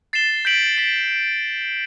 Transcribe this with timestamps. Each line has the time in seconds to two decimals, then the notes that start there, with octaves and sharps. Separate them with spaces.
0.13 A6 C7 E7 G7
0.45 G6 B6 D7 F#7
0.77 B6 D7 F#7